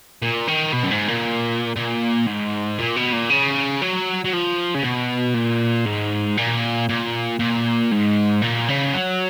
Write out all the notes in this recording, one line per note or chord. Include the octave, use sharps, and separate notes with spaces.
A#2
D#3
B2
F#2
G#2
A#2
A#2
G#2
A#2
B2
A#2
C#3
F#3
F#3
F3
C#3
B2
A#2
G#2
A#2
A#2
A#2
G#2
A#2
C#3
F#3